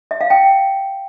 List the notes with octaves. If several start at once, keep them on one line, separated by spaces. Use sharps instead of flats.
E5
F5
G5